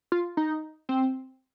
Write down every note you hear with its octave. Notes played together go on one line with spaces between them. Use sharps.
F4
D#4
C4